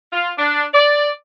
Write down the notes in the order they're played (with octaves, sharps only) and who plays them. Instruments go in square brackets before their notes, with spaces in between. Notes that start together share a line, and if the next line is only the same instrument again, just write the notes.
[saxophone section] F4
D4
D5